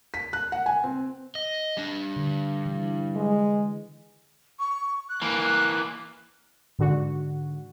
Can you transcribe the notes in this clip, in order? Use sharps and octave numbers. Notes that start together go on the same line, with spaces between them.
B6
F#6
F#5
G#5
C4
D#5
G3 D4
D3
E3
G#3
C#6
F#6
E3 A#3
G#2 D3 F#4